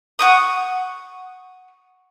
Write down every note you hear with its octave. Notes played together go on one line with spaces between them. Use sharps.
F#5 C#6 D#6